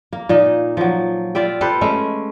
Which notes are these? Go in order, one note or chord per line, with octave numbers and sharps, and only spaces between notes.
A#3
A#2 D#4 D#5
F3 F#3
F4 D5 E5 G5
G4 A4 B4 C5
G#3 A3 C#4